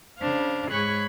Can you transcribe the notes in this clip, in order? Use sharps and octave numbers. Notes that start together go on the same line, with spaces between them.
C#3 D4 C5 F5
G#2 G#4 C#5 B5 C#6 F#6